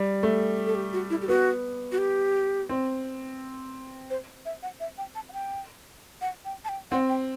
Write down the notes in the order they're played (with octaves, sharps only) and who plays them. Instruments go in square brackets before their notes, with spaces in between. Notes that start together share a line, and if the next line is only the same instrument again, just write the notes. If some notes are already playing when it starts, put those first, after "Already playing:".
Already playing: [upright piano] G3
A3
[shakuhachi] A4
G4
F#4
E4
G4
[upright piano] B3 [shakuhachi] F#4
[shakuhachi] F#4
G4
[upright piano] C4
[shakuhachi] C5
E5
F#5
E5
G5
A5
F#5
G5
F#5
G5
A5
G5
[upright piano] C4 [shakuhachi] F#5
[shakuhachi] G5